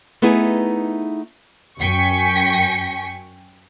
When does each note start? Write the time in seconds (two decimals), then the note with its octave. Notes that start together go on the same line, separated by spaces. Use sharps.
0.22 A3 B3 D#4 E4 G#4
1.80 F#2 G5 G#5 C#6 B6 C#7